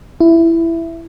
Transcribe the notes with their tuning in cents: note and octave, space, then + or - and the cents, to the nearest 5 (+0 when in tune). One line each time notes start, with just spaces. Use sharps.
E4 +10